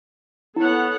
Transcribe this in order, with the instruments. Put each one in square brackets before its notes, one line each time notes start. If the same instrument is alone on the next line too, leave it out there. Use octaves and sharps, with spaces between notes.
[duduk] B3 [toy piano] E4 [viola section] A4 C#5 F#5